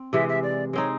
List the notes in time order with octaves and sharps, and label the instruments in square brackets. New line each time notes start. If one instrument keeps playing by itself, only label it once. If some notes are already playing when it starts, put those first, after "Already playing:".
Already playing: [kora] C4
[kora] C3 E3 G#3 [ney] E5
[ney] E5
D5
[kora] G#3 C4 D#4 [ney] C#5